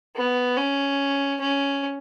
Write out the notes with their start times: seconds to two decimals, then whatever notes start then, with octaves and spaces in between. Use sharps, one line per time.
0.16 B3
0.57 C#4
1.41 C#4